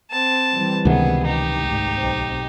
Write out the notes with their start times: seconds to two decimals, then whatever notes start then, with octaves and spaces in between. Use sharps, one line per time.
0.10 C4 A5
0.53 E3 G3
0.85 C#2 C3 D#3 B3 G#4
1.26 D#4 G4
1.60 A1 G#2
1.96 B1 C4